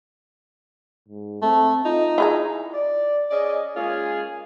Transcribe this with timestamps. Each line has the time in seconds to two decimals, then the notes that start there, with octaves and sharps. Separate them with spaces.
1.08 G#2
1.42 A3 C4
1.85 D#4 F4
2.18 E4 G#4 A#5
2.73 D5
3.31 C#4 G#4 D5 D#5
3.76 G#3 A#3 C#4 F4 G#4